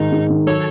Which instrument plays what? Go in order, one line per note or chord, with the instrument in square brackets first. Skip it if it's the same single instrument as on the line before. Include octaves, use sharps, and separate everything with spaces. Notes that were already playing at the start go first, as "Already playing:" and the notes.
Already playing: [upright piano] G#2 D#3 [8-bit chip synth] D#4
[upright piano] G#2
D#3
[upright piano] F#3 [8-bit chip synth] A4 C#5